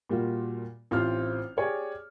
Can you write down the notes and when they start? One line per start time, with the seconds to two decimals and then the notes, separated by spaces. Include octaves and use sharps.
0.09 A#2 G3 F4 F#4
0.91 A1 C4 F4 G4 C5 F6
1.57 G4 G#4 C#5 D5